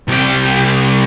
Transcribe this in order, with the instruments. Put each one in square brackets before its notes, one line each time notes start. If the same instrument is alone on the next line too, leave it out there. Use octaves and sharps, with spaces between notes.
[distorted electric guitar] C2 G4